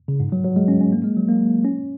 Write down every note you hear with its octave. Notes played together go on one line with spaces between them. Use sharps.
C#3
G#2
F#3
F#3
G#3
C#4
C#4
A#3
G#3
F#3
A#3
C#4